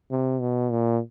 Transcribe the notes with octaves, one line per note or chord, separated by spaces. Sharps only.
C3
B2
A#2